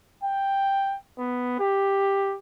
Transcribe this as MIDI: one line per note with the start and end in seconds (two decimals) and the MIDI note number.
0.23 0.98 79
1.18 1.57 59
1.60 2.36 67